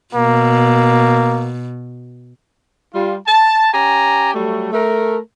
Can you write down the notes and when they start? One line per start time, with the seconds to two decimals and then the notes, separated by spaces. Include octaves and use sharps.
0.15 B2 A#3
2.94 G3 F4
3.27 A5
3.74 C#4 G4 G#5 A#5
4.35 F#3 G3 A3
4.73 A3 A#4